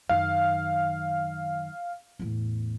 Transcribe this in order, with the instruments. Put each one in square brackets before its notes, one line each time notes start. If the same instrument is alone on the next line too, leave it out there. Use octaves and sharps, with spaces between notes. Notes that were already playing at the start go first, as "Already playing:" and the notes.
[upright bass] F#2 D#3 [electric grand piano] F5
[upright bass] E2 A2